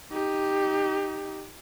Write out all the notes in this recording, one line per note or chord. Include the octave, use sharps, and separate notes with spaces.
D#4 G4